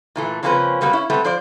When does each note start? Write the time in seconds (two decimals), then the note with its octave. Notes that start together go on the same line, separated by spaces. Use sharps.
0.16 A#2 E3 A3
0.43 C#3 F3 A#3 C4 C#4 B4
0.81 F#3 G3 A#3 B3
0.93 C#4 E4
1.10 G3 A3 B3 C4
1.24 F3 C5 D5